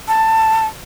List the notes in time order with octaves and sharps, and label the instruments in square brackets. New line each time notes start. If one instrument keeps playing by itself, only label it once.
[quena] A5